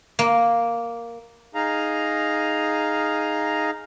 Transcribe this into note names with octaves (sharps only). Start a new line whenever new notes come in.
A#3
D#4 G#4 F5 A#5